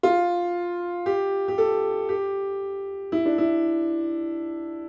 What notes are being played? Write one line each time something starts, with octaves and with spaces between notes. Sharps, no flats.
F4
G4
G4
A4
G4
E4
D4
E4